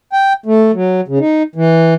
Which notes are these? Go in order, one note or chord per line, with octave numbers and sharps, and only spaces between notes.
G5
A3
F#3
C#3
D#4
E3